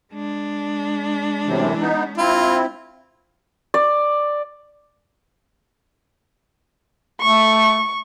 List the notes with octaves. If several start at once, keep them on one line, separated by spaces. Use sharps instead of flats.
G#3 D4
F#2 A2 C3 E3
B3 D#4
C4 E4 F4
D5
A3 C#6